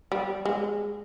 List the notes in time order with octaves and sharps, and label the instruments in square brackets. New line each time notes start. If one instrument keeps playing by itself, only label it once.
[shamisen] G3
G#3